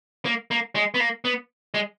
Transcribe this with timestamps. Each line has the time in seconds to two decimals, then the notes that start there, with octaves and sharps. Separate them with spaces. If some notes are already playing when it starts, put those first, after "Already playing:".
0.25 A#3
0.51 A#3
0.75 G#3
0.94 B3
1.00 A#3
1.25 B3
1.74 G#3